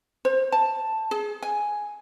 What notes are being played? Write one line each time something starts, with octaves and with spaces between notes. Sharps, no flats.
C5
A5
G#4
G#5